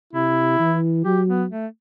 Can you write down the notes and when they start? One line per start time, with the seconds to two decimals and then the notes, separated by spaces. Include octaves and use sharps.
0.13 C3 E4
0.59 E3
1.05 F#3 G4
1.28 B3
1.51 A3